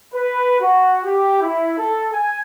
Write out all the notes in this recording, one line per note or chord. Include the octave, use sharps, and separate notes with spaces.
B4
F#4
G4
E4
A4
G#5